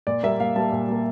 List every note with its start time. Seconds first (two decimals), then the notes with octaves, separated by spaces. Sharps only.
0.07 A#2 D5
0.23 G3 A#3 E5
0.40 A#2 F5
0.56 G3 A#3 A5
0.72 A#2
0.89 G3 A#3